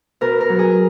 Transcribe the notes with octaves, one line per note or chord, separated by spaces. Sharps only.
B2 A#4
A#4
F#3
G#4